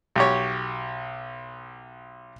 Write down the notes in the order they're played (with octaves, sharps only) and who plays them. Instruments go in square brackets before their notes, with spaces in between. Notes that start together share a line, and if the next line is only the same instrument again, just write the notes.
[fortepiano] B1 G4 C#5